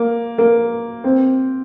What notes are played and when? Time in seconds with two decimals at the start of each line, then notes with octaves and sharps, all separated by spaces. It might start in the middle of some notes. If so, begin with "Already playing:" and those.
Already playing: A#3
0.38 A#3
1.04 C4